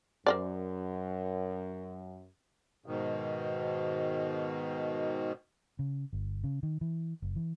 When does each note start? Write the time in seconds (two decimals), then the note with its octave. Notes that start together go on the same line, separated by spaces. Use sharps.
0.26 F#2 A#4 C5 D5
2.86 G#2 B2 D#3
5.79 C#3
6.13 G1
6.44 C#3
6.63 D#3
6.81 E3
7.22 F#1
7.36 E3